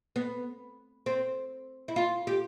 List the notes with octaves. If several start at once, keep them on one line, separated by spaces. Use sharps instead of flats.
B3
C4
E4
F4
G4